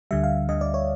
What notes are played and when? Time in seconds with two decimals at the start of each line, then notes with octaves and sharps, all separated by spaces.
0.11 D2 D3 G3 E5
0.24 F5
0.49 D2 D3 G3 D#5
0.61 D5
0.74 C#5